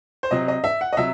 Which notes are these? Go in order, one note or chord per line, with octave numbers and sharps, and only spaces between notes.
C5
C3 F#3 C4 D#5
D#5
E5
F#5
D#5
C3 F#3 E5